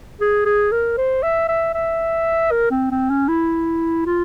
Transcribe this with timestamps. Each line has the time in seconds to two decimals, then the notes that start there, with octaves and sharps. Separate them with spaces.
0.21 G#4
0.46 G#4
0.72 A#4
0.97 C5
1.23 E5
1.48 E5
1.74 E5
2.51 A#4
2.71 C4
2.91 C4
3.10 C#4
3.28 E4
4.06 F4